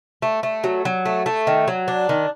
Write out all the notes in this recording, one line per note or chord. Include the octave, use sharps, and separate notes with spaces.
A3
A3
F#3
F#3
A3
A3
D#3
F#3
D4
D#3